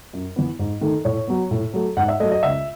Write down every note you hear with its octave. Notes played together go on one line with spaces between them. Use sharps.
F#2
E3 B3
G#2
D#3 A3
A2 C#5
F#3 B3
A2
F#3 A3
G#2 F#5
E5
F#3 A3 D#5
D#5
C#2 E5